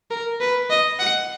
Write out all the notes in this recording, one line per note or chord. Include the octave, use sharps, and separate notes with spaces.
A#4
B4
D#5
F#5